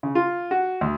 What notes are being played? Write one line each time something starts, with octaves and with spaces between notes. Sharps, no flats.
C#3
F4
F#4
D2